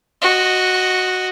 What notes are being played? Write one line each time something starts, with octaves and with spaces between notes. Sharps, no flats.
F#4 D#5